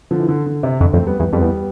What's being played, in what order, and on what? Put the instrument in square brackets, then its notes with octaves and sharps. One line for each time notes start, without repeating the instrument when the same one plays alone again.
[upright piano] D3 F3
E3
D3
D3
C3
[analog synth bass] F2 [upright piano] D3
[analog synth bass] F2 [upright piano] A3 C4
[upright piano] G3 B3
[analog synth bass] E2 [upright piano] G3 B3
[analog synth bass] F2 [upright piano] G3 B3
[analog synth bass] E2